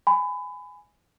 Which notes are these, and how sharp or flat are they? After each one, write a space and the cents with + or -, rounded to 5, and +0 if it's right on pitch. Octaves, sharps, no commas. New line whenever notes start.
G#5 +0 B5 +25